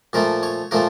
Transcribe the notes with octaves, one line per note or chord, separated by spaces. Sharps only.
A#2 F3 A3 A#4
C#5
A#2 F3 A3 A#4